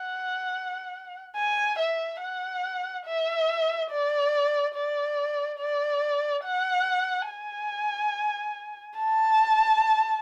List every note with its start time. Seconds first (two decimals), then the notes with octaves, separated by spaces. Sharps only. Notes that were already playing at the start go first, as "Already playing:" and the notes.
Already playing: F#5
1.36 G#5
1.79 E5
2.21 F#5
3.06 E5
3.91 D5
4.75 D5
5.60 D5
6.44 F#5
7.29 G#5
8.98 A5